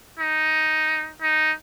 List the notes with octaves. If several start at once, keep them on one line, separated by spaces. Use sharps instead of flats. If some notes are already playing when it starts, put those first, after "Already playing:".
D#4
D#4